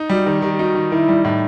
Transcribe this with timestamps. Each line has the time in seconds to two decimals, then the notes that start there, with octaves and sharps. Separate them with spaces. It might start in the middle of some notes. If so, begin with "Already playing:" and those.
Already playing: D#4
0.10 G3 F#4
0.26 D#3 G4
0.42 D#3 G4
0.53 G4
0.59 D#4 F#4
0.75 D#3
0.92 D#3 E4
1.09 G3
1.24 A2 D#4